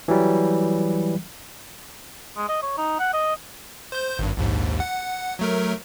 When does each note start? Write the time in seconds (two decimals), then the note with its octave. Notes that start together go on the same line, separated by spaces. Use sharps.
0.08 E3 F#3 G3
2.37 G#3
2.49 D#5
2.63 C#5
2.78 D#4
3.00 F#5
3.13 D#5
3.92 C5 G6
4.19 G#1 G2
4.37 A#1 D#2 G#2
4.80 F#5
5.39 F#3 A3 A#4